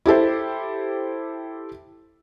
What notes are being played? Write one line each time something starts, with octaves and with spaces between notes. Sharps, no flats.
E4 G4 A4 C5